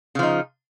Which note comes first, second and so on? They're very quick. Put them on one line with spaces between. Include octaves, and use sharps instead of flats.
C#3 F3 D#4